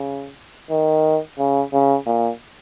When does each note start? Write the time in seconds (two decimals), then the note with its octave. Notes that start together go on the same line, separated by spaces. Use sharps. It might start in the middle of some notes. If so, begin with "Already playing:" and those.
Already playing: C#3
0.71 D#3
1.39 C#3
1.73 C#3
2.07 A#2